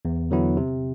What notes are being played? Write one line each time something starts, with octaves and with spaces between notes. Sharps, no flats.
E2
D3 F#3 B3 E4
C3